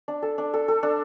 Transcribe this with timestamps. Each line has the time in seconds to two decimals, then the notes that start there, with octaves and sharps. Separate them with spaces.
0.08 D4
0.22 A4
0.38 D4
0.54 A4
0.68 A4
0.83 D4